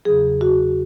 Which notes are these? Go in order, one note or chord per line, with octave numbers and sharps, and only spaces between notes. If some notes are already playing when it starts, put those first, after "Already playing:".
E2 C#3 F#3 G#4
F#4